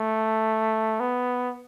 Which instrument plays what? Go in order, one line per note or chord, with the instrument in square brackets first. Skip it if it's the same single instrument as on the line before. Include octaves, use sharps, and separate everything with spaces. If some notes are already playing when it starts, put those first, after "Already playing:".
Already playing: [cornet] A3
B3